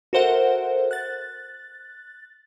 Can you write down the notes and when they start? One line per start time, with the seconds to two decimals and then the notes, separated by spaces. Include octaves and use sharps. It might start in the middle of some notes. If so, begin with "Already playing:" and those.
0.13 F#4 A4 A#4 C5 E5 F#5
0.91 F#6 A6